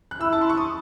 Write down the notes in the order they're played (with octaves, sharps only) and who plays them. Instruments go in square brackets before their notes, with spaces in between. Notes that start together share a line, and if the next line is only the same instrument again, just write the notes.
[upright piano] F#6
[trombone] E4 [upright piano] E6
[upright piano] A5
C6
C#6
D#6